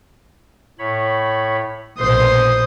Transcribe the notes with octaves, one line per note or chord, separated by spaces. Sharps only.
A2 C#5 B5
A#1 B2 C5 C6 D#6